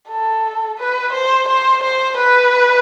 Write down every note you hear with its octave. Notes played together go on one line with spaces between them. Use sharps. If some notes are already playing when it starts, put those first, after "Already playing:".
A4
B4
C5
C5
C5
B4